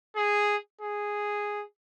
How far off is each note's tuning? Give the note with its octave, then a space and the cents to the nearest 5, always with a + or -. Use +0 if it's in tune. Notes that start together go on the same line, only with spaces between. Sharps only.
G#4 -5
G#4 -5